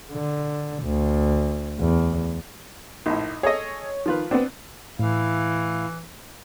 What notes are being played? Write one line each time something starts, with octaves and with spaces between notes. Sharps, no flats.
D3
D2
E2
A#1 A2 D#4
G#4 A4 C#5 D#5
D#3 F3 F4 B4
B3 C4 D4
A2 E3 E4 F5